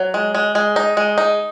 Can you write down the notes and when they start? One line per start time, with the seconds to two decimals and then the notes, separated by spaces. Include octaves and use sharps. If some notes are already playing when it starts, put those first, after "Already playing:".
Already playing: F#3
0.14 G#3
0.35 G#3
0.55 G#3
0.76 D#4
0.97 G#3
1.18 D#4